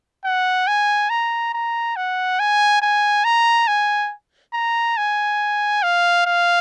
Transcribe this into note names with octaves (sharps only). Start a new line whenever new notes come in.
F#5
G#5
A#5
A#5
F#5
G#5
G#5
A#5
G#5
A#5
G#5
F5
F5